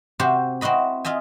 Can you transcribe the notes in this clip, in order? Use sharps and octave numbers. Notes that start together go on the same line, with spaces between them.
C3 F#4 G4 C5
C4 E4 F#4 D#5 B5
F4 D#5 E5 G#5